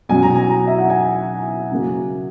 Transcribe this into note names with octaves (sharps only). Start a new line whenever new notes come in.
B2 F#3 C#4 G#5
A#5
G#5
A#5
E5
F#5
G#5
C#3 F#3 A#3